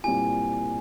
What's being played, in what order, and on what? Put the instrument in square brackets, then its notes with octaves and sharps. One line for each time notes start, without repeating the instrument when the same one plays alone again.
[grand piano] A#2 G3 C4 E4 G4 [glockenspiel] G#5